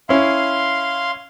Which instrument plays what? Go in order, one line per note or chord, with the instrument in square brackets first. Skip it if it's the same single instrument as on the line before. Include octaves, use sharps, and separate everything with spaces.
[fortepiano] C#4 E4 [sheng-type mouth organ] F5 C6